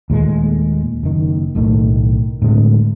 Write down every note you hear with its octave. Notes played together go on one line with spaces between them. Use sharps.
D#2 A#2 G#3 A3
F#1 D#3
B1 A2 D#3 A3
A2 D3 G#3 C4